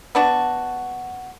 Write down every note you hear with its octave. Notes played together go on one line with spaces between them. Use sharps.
B3 D4 F#4